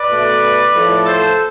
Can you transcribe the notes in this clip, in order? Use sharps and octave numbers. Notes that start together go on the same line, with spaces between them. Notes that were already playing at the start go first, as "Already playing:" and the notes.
Already playing: B4 D5
B2 A3
A2 F3 A3
A4 C5